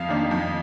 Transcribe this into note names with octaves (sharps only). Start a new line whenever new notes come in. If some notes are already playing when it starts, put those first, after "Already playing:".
Already playing: F2 F5
D#3 A#3 D4
F2